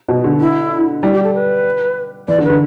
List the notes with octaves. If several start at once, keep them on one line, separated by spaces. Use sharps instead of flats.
B2
D3
E4
G3 E4
G4
A4
B4
E3 D5
D3
B4
D3